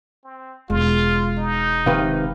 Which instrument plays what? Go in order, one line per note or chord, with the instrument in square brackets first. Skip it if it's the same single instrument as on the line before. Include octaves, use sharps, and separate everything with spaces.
[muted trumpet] C4
[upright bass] E1 [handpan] G#3 [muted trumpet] F4
[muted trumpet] D#4
[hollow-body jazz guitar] C3 D#3 B4 [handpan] F5